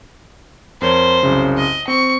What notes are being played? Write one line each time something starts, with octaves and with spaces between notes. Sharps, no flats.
F2 A#4 C5 C#5
C2 F#2 C#3
D#5
C4 C#6